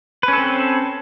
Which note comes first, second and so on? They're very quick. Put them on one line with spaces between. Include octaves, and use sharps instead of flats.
B4 C#4 A4 C4